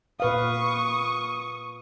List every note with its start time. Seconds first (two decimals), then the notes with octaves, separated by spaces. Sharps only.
0.20 A#2 B4 F5 C#6 D#6